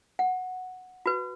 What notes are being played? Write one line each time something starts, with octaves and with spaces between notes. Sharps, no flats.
F#5
F#4 B4